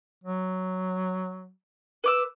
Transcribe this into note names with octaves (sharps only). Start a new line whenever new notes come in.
F#3
B4 D6 E6